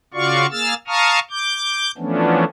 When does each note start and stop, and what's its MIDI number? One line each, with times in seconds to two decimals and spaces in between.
0.14 0.46 49
0.14 0.46 65
0.14 0.46 66
0.14 0.46 74
0.14 0.46 77
0.14 0.46 85
0.51 0.74 58
0.51 0.74 68
0.51 0.74 88
0.51 0.74 89
0.51 0.74 93
0.87 1.19 77
0.87 1.19 81
0.87 1.19 82
0.87 1.19 85
0.87 1.19 87
0.87 1.19 89
1.30 1.91 86
1.30 1.91 91
1.98 2.44 52
1.98 2.44 53
1.98 2.44 57
1.98 2.44 59
1.98 2.44 61
1.98 2.44 62